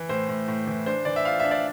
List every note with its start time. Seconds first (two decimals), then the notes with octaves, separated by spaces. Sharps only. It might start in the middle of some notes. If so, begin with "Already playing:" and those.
Already playing: E3
0.09 A2 C5
0.29 A2
0.48 A2
0.67 E3
0.86 D4 C5
1.05 E3 D5
1.16 E5
1.25 F4 F5
1.40 D4 E5
1.51 D5